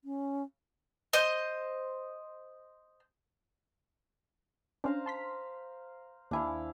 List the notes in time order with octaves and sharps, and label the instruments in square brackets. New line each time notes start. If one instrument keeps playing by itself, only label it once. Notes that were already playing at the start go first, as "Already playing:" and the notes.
[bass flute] C#4
[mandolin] C5 D#5
[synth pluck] C#4 D4 [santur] C5 F5 A#5
[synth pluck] A5 C6 B6
[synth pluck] D#2 G#5 [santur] D4 E4 F5